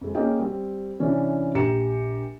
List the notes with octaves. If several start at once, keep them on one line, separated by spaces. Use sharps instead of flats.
F2 G#3
A#3 C#4 G#4 D#5 G5
G3 C4
C3 E3 C#4 D4
A#1 G4 A#5 C#7 E7